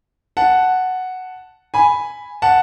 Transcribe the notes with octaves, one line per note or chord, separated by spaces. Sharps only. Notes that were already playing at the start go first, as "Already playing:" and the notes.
F#5 A5
G#5 B5
F#5 A5